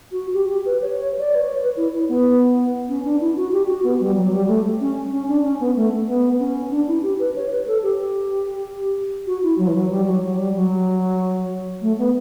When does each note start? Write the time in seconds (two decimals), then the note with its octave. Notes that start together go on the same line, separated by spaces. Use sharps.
0.12 F#4
0.34 G4
0.49 G4
0.66 B4
0.82 C#5
0.97 C#5
1.19 D5
1.35 B4
1.40 C#5
1.61 B4
1.77 E4
1.94 E4
2.09 B3
2.89 C#4
3.05 D4
3.20 E4
3.37 F#4
3.52 G4
3.68 F#4
3.84 B3
4.00 G3
4.17 F#3
4.32 G3
4.48 A3
4.81 C#4
5.12 C#4
5.28 D4
5.43 C#4
5.60 B3
5.76 A3
6.07 B3
6.40 C#4
6.71 D4
6.88 E4
7.03 G4
7.19 B4
7.36 C#5
7.51 B4
7.67 A4
7.83 G4
9.27 F#4
9.43 E4
9.58 F#3
9.67 E3
9.75 F#3
9.90 G3
10.06 F#3
10.23 F#3
10.38 G3
10.55 F#3
11.82 A3
11.98 B3